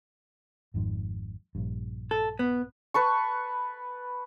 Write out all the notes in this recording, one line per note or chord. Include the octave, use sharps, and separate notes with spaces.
G#1 F2 G#2
A#1 G2
A4
B3
B4 A5 C#6